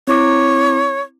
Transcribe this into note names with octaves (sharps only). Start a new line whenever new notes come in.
C4 E4 C#5 D6